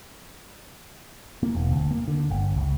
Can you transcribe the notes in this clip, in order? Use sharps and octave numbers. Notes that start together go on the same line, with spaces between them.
A#3
E1
D2
A#3
D3
G1
C#2